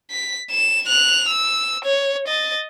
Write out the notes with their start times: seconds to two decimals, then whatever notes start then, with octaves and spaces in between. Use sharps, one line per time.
0.11 B6
0.51 E7
0.87 F#6 F7
1.28 E6
1.84 C#5
2.27 D#5 A6